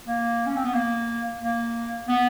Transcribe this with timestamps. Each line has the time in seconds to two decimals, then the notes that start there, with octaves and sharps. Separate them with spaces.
0.06 A#3
0.46 C#4
0.56 C4
0.64 B3
0.74 A#3
1.41 A#3
2.08 B3